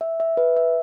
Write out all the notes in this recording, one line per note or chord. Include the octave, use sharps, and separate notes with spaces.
E5
E5
B4
E5